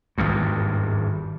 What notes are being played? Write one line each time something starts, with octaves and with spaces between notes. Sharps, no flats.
G#1 E2 G2